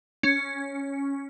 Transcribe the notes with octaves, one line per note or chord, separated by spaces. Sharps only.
C#4